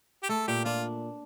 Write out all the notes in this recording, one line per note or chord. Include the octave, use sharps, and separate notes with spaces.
G4
A3 A4
A#2 G4
D4 F4